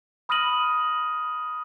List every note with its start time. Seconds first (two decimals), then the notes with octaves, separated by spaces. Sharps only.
0.29 B5 D#6 F6 A#6 D#7 F#7